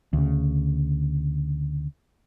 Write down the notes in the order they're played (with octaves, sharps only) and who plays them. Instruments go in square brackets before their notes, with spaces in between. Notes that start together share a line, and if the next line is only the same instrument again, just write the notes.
[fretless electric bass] D2 C#3